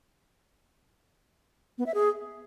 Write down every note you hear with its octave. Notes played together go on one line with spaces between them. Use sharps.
B3
E5
G#4